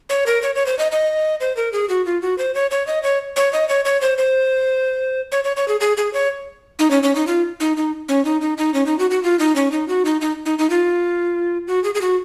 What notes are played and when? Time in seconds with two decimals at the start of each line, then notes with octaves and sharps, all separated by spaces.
0.10 C#5
0.26 A#4
0.43 C#5
0.55 C#5
0.66 C5
0.79 D#5
0.92 D#5
1.40 C5
1.57 A#4
1.73 G#4
1.89 F#4
2.06 F4
2.22 F#4
2.38 C5
2.55 C#5
2.71 C#5
2.87 D#5
3.03 C#5
3.36 C#5
3.53 D#5
3.69 C#5
3.85 C#5
4.01 C5
4.18 C5
5.32 C#5
5.44 C#5
5.57 C#5
5.68 G#4
5.80 G#4
5.97 G#4
6.13 C#5
6.79 D#4
6.91 C#4
7.03 C#4
7.15 D#4
7.27 F4
7.60 D#4
7.77 D#4
8.09 C#4
8.25 D#4
8.41 D#4
8.58 D#4
8.74 C#4
8.86 D#4
8.99 F#4
9.11 F#4
9.23 F4
9.39 D#4
9.56 C#4
9.72 D#4
9.88 F#4
10.05 D#4
10.21 D#4
10.46 D#4
10.59 D#4
10.70 F4
11.67 F#4
11.84 G#4
11.95 G#4
12.01 F#4